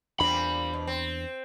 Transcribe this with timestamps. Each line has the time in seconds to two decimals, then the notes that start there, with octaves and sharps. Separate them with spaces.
0.20 E2 A#2 G3 C4 D4 B5
0.74 B2
0.87 C4